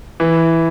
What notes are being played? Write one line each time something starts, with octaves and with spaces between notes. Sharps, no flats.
E3